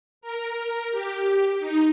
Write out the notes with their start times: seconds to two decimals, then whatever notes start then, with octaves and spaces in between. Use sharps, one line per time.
0.21 A#4
0.91 G4
1.59 D#4